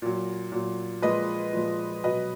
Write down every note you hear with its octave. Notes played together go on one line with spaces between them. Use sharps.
A#2 F#3
A#2 F#3
A#2 F3 G#3 B4 D#5
A#2 F3 G#3
B2 F#3 B4 D#5